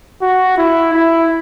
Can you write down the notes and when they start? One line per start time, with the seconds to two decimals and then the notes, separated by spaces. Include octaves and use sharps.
0.22 F#4
0.58 E4
0.94 E4